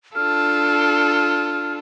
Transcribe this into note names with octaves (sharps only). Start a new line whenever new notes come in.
D4 F4 A4 F6